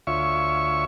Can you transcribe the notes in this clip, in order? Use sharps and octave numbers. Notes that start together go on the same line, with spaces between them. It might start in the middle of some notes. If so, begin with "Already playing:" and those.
D2 F4 C#5 E5 C#6